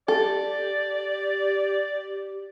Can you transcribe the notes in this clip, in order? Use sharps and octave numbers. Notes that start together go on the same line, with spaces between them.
G4 A4 D5